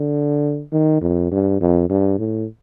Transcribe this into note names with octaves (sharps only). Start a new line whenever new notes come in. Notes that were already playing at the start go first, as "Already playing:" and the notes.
Already playing: D3
D#3
F2
G2
F2
G2
A2